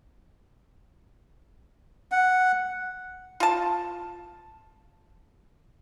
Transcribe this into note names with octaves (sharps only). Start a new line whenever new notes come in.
F#5
F4 A5